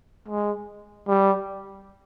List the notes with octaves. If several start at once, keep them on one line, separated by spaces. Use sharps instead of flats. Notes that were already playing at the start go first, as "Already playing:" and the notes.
G#3
G3